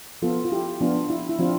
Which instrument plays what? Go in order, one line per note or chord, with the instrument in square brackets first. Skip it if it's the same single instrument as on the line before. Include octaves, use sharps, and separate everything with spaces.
[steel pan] F3 B3 F4 A4
F4
E4 G4
F3 B3 D4 F4
E4
E4
F3 C4 D4 F4